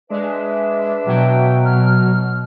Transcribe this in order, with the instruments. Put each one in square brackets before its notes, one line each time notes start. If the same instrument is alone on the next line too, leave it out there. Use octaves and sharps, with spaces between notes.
[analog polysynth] G#3 [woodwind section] D4 B4 E5
[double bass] B2 [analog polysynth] F#3 [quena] G5
[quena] F6